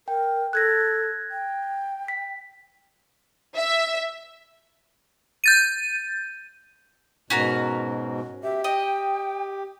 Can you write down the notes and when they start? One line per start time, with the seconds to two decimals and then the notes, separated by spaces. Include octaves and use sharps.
0.08 A#4 G5
0.53 A4 F#6 G#6 A#6
1.31 G5
2.08 B6
3.56 E5
5.44 G6 A6 D#7
7.30 G#2 B2 C#4 F#4 A#4
8.43 G4 E5
8.64 D#5 G5